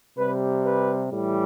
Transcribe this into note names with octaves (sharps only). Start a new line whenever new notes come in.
C3 G3 B4
B4
A2 E3 G3